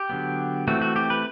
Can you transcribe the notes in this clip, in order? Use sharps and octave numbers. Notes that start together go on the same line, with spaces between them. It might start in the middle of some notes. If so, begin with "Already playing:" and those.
Already playing: G4
D3 F#3 B3
E3 A3 C4 F#4
F#4
G4
B4